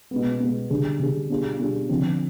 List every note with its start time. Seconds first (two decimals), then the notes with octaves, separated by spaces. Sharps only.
0.11 B2 G#3 B3
0.40 B2 G#3 B3
0.70 D3 G3 D4 G#4
1.00 D3 G3 D4 G#4
1.30 B2 G3 D4 F4 G#4
1.59 B2 G3 D4 F4 G#4
1.89 D3 F3 C4